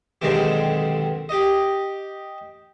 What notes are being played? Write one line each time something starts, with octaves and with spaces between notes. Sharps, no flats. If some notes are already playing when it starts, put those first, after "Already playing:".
B1 D3 D#3 G#3 C4 G4
G4 D#5